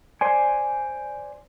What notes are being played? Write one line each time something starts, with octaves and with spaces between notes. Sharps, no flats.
C5 D5 G#5